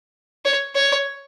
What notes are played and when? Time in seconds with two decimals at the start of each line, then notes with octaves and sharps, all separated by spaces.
0.45 C#5
0.76 C#5